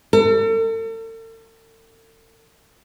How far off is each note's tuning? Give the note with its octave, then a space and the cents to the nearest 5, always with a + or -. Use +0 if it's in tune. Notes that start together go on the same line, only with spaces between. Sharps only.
A4 +45